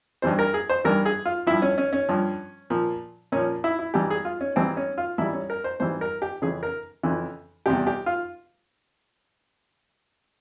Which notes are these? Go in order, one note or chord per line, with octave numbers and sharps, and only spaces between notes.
G2 E3 G3 C5
A#4
G#4
C5
G2 E3 G3 A#4
G#4
F4
G2 F3 E4
C#4
C#4
C#4
G2 F3
A#2 F3
A#2 F3 C#4
E4
E4
G#2 E3 G3 G4
G#4
F4
C#4
G#2 E3 G3 C4
C#4
F4
G#2 E3 G3 E4
C#4
A#4
C5
G#2 E3 G3 C5
A#4
G4
F2 C#3 E3 G#4
A#4
F2 C#3 E3
E2 C3 G3 G4
G4
F4